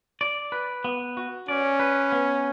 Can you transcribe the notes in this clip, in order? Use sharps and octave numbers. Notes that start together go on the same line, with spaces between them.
D5
B4
B3
F#4
C#4 D5
B4
B3